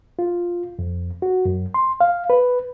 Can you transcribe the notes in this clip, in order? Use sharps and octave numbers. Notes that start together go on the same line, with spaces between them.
F4
F2
F#4
F#2
C6
F5
B4